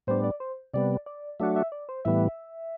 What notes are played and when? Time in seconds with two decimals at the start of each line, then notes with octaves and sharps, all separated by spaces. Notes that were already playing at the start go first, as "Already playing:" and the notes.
0.07 A2 G3 B3 D4 C5
0.24 D5
0.40 C5
0.74 C3 G3 B3 D5
1.06 D5
1.40 F#3 A3 D4 F#4 E5
1.56 E5
1.72 D5
1.89 C5
2.05 A2 E3 G3 B3 E5